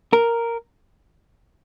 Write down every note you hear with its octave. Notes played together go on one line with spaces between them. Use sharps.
A#4